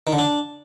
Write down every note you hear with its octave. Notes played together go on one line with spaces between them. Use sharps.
D#3
D3
D4